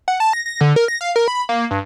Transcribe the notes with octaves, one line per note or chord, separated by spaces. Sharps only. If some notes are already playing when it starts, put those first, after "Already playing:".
F#5
A5
A#6
A#6
D3
A#4
A#6
F5
A#4
B5
A#3
G2